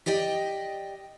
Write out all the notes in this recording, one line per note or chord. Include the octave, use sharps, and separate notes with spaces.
G4 D5 D#5 G5